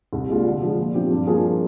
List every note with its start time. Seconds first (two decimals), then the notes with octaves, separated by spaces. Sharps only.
0.13 C2
0.29 A#2 G#3 D4 F4
0.46 D3
0.62 F3 G#3
0.78 A#2
0.94 F3 C4 G4
1.11 G2
1.27 F3 A#3 F4 G#4